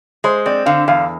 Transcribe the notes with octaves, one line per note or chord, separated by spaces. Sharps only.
G#3 C5
C4 D5
D3 F5
E2 F5